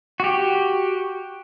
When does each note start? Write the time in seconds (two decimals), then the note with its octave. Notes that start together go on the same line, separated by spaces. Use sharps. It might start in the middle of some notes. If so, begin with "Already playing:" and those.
0.20 F#4 G4